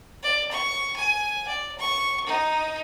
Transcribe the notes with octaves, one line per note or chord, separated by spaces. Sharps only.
D5
C#6
G#5
D5
C#6
D#4